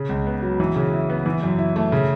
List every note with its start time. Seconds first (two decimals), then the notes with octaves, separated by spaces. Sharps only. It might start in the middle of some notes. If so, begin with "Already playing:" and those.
Already playing: C#3
0.09 C#2
0.27 B3
0.42 F#3
0.60 E3
0.76 C#3
0.93 E4
1.09 B3
1.26 E3
1.43 F#2
1.58 E4
1.76 A3
1.92 C#3